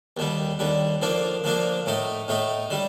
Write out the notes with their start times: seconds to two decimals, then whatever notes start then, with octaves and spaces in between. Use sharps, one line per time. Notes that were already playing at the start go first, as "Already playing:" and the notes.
0.17 D#2 D3 G3
0.59 D#2 D3 G3
1.02 D3 F3 A#3 D4
1.44 D3 F3 A#3 D4
1.86 A2 A3 D#4
2.28 A2 A3 D#4
2.70 D3 G3